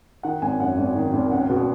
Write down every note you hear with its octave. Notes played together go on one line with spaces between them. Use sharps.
D#3 F#5
G#1 G#5
F#2 F#5
G#1
D#3
G#1
C#2 F#5
B2